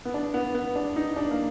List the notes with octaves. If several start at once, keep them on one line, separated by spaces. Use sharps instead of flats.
B3
D4
B3
B3
D4
D#4
D4
A#3